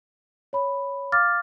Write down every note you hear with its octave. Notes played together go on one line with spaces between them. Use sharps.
C#5 B5
F5 D6 F6 A6